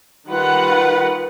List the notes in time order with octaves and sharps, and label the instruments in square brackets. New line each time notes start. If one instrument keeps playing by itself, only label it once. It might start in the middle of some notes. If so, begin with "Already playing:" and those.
[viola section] D#3 G3 F4 B4 F#5